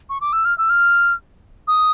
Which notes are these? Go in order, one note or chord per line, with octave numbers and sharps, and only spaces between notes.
C#6
D6
E6
F6
E6
F6
D#6